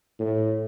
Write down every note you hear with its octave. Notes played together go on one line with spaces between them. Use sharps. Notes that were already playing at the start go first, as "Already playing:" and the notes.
A2